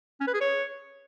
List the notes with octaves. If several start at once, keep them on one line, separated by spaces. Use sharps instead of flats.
C#4
B4
G#4
C#5